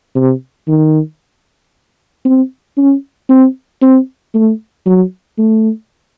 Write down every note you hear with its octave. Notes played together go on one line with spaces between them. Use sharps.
C3
D#3
C4
C#4
C4
C4
A3
F#3
A3